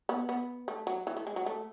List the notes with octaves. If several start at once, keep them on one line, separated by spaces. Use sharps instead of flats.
B3
B3
A3
F#3
E3
A3
G#3
F#3
A3